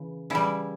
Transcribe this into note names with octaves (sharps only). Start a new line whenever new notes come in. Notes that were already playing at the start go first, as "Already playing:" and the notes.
Already playing: C#3 E3
C#3 E3 G3 E4